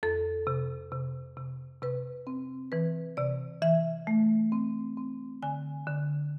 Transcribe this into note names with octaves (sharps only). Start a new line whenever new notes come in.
F2 A4
C3
C3
C3
C3 B4
C4
E3 B4
C3 D5
E3 E5
A3
C4
C4
D3 G#5
D3